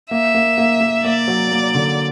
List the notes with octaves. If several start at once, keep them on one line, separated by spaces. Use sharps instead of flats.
A#3 E5
A#3
A#3
A#3
A#3 D5
F#3
A#3
D3